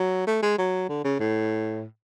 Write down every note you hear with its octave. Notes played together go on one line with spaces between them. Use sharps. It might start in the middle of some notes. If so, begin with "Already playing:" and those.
Already playing: F#3
A3
G#3
F#3
D3
C#3
A2